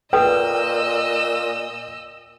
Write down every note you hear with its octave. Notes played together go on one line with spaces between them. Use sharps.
A#2 A4 B4 D#5 G5 E6